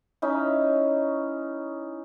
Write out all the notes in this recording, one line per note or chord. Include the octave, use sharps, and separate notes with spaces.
C#4 D#4 E4